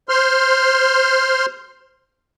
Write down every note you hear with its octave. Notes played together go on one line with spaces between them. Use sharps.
C5 C6 F6